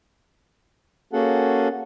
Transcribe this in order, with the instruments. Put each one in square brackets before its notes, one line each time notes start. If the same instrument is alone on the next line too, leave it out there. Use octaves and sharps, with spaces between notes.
[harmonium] A#3 C#4 F#4 G#4 A4 F#5